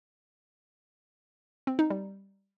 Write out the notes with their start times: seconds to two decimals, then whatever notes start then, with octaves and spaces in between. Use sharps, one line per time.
1.67 C4
1.79 D#4
1.90 G3